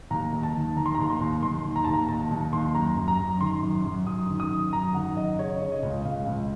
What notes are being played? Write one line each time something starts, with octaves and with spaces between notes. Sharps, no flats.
D#2 A#5
D#2
A5
D#3
D#3 A#5
C6
D#2 A#5
C6
D#2
D#2 C6
D#3
A#5
D#2 A5
A#5
D#2 A5
D#2
D#2 C6
F#2 A#5
F#2
A#5
F#2
D#3 C6
F#2
F#2
F#2 D#6
D#3
D#6
F#2
F#2 A#5
D#3 F#5
F#2 D#5
C#3 C#5
C#3
D#5
C#2
C#2 F5
C#2